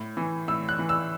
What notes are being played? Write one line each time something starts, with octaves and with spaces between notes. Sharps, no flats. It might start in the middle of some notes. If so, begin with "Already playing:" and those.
Already playing: A2
E3
A2 E6
F#6
E3
E6